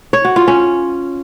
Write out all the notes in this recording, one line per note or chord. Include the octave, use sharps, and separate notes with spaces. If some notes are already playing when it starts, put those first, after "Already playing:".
C#5
F#4
F4
C#4